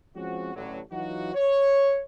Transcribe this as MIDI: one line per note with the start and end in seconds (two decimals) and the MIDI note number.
0.16 0.54 53
0.16 0.54 56
0.16 0.54 60
0.16 0.54 61
0.16 0.54 66
0.55 0.80 33
0.55 0.80 45
0.55 0.80 50
0.55 0.80 54
0.91 1.34 52
0.91 1.34 54
0.91 1.34 63
0.91 1.34 65
0.91 1.34 66
1.35 2.02 73